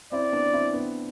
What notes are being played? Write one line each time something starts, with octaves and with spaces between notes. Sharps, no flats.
C4 E4 D5
B3 D4
C4 E4
B3 D4